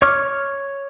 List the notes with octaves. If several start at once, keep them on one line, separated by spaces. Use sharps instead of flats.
C#5 C#6 D6 F6